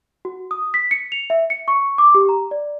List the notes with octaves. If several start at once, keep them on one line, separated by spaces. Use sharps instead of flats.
F#4
D#6
B6
C#7
F7
E5
C#7
C#6
D6
G4
A#5
D5